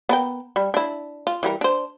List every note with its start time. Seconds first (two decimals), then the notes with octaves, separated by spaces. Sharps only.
0.09 B3 A#4 G5
0.56 G3
0.74 D4 E4
1.27 F4
1.43 E3 G3 A#4
1.61 D4 C5